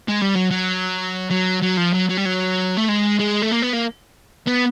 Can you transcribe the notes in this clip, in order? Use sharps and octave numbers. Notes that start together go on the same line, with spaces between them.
G#3
G3
F#3
F#3
F#3
F#3
F3
F#3
F#3
G3
F#3
A3
G#3
G#3
A3
A#3
B3
A#3
B3